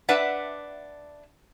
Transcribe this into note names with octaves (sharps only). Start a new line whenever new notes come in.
D4 B4 D5 E5 F#5